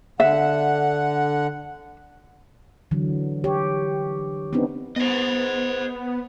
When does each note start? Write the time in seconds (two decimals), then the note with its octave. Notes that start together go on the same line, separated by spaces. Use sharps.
0.20 D3 E5 F#5
2.91 D3 E3 F#3
3.44 G4 C#5
4.53 B3 C4 D4 D#4
4.96 B3 C5 D#5